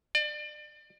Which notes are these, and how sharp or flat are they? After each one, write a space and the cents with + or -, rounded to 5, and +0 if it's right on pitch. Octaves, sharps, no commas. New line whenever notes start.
D5 +30